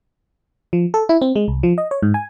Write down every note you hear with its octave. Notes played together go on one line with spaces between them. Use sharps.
F3
A4
E4
C4
G#3
C2
F3
D#5
C#5
G#2
G#5